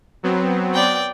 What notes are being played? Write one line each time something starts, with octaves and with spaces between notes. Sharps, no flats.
F#3 B3 C4
D5 G5